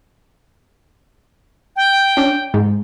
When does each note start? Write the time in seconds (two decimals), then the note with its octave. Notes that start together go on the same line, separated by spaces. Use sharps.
1.76 G5
2.17 C#4 D4
2.54 G#2